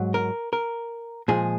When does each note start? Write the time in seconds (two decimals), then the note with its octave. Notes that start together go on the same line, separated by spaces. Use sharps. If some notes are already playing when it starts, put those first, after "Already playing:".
Already playing: G#2 F#3
0.14 A#4
0.53 A#4
1.28 A#2 F3 G#3 G#4